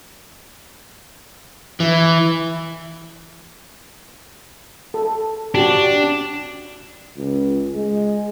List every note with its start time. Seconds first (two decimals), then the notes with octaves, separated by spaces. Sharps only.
1.80 E3
4.94 A4
5.55 D4 F#4 G4
7.17 C#2
7.75 G#3